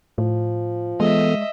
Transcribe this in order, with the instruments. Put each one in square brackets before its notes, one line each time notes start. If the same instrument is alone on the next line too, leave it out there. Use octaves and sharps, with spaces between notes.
[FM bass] A2 [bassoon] F3
[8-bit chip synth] E3 B3 A4 [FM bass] G#3 [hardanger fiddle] D#5 E5